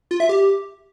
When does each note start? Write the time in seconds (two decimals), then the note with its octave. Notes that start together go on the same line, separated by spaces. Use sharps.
0.11 F4
0.20 E5
0.29 G4